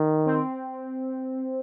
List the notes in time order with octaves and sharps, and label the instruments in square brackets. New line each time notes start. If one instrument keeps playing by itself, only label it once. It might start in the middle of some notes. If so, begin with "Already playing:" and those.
Already playing: [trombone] D#3
[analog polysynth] C4